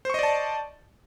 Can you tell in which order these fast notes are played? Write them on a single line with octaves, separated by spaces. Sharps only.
C5 C#6 D#5 D5 A5